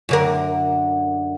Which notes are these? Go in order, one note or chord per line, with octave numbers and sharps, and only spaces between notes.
F#2 D3 A#4